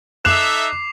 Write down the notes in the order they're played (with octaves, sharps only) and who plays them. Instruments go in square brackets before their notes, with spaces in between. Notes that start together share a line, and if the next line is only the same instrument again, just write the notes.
[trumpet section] D#4 A4 E5 [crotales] D6 C7 F7 [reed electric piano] F#6 [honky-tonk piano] E7